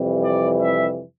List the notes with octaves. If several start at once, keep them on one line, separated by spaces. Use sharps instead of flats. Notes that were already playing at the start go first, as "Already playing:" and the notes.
Already playing: F2 C3 E3 G3
D5
E5